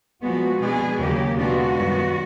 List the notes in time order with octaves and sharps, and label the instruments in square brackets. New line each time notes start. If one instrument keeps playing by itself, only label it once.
[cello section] A#2 F3 G#3 B3 F#4
B2 G#3 B3 D4 G#4
D#2 C#3 F#3 A#3 G4
B2 G#3 B3 D4 F4 F#4
F#2 D#3 G3 B3